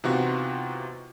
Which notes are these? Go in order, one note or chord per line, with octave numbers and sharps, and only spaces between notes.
C3 E3 B3 D#4 F4 F#4